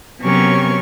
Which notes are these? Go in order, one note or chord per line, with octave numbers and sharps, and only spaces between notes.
C3 F#3 B3 C#4 A#4 C#6